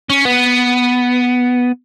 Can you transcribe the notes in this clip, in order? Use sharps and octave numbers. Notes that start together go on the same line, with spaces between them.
C#4
B3